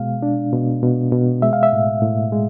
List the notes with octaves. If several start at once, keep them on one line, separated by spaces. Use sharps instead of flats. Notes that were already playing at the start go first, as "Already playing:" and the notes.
Already playing: B2 G#3 F5
D4
B2
B2
B2
G#3 E5
F5
E5
A2
A2
G#3